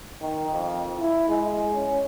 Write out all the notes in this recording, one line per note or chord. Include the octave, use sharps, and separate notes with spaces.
D#3
F2
E4
G#3
C#4